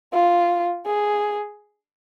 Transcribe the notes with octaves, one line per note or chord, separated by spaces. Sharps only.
F4
G#4